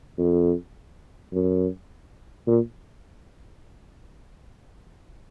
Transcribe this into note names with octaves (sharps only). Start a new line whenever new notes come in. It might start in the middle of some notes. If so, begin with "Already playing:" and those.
F2
F#2
A#2